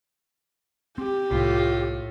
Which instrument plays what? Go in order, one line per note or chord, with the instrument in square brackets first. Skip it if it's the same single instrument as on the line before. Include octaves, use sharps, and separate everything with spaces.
[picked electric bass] C4 [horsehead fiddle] G4
[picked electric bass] C2 [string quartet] A2 [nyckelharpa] F4